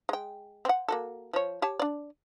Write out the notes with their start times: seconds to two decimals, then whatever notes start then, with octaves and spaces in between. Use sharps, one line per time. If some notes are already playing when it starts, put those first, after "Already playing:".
0.09 G#3 G5
0.65 C4 F#5
0.88 A#3 F#4 A4
1.33 F3 C#5
1.62 G4 C#5 A5
1.79 D4 D5